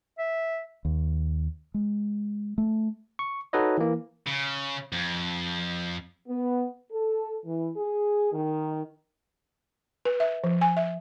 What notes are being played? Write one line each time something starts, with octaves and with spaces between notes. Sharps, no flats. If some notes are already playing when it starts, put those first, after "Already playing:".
E5
D#2
G#3
A3
C#6
D#4 F#4 A4 B4 C#5 D#5
E3 A#3
C#3
F2
B3
A4
E3
G#4
D#3
B4
E5
F3
G#5
E5